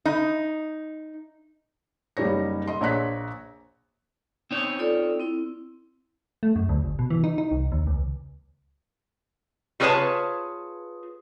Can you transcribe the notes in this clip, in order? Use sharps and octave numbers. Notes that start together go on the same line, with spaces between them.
D#4
F#1 G3 D#4 C#5 A#6
D#5 C6
A#1 C#5 A#5 F#6 B6
C4 D#4 C#5
F4 A4 D5
C4 E4
A3
F#2
D2
G1
B2
E3
D#4
D#4
C2
D#2
C#2
G3 F4 G#4 B4 C#5 A5